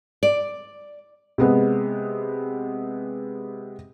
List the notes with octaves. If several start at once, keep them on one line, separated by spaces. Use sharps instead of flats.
D5
C3 G#3 B3